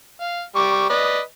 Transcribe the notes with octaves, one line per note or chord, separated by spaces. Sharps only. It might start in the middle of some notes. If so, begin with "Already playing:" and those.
F5
G3 C#6 D6
B4 D5 D#5